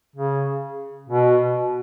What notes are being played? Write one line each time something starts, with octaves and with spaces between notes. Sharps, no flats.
C#3
B2